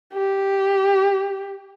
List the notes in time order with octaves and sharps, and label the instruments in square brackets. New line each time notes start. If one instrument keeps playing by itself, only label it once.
[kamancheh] G4